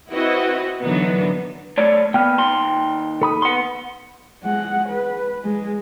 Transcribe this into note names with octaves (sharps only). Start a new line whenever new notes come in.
C4 E4 F#4 B4 D#5
D3 E3 F#3 B3 D#4
A3 C#5 D5
A#3 B3 G5 F6
D#2 A#5 C6
A4 B5 D#6
B3 F#5 C6
G#3 F#5
B4
G#3